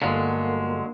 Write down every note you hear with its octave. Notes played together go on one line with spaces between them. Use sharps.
G1 D3 F#3 G#3 A#3 F5